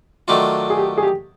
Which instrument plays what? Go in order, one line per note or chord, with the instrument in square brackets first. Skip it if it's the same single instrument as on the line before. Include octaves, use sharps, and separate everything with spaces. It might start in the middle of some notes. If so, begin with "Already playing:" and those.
[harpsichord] D#3 F#3 A3 D4 F4
[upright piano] G#4
G4
G#4
G4